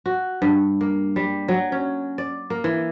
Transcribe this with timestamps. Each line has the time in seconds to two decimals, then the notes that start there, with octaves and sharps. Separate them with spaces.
0.06 F#4
0.42 G2
0.81 A#3
1.16 G3
1.48 F#3
1.72 C#4
2.18 D5
2.50 A#3
2.64 E3